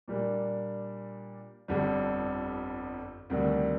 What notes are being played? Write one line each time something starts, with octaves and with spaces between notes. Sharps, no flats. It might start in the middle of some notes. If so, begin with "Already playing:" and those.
A#2 G3 A#3 D4
G1 F2 D3 G3
D2 C3 D#3 G3 D4